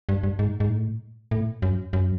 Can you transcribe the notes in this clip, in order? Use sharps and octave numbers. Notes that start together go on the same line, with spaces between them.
G2
G2
G#2
G#2
A2
A2
F#2
F#2